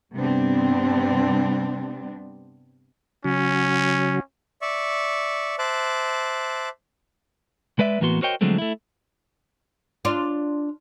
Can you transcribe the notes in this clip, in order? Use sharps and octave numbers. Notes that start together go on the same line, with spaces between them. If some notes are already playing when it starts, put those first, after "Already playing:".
G2 C3 G3 B3 C4 D4
C#3 F#3 C#4
D5 E5 C#6
C5 E5 A5 D6 F#6
G#3 B4 D5 E5
A2 E3 A#3 B3 F#4 C6
F#4 A#4 C5 C#5 D#5 G5
D3 F3 F#3 G#3 A3 C4
A3 E4
D4 F4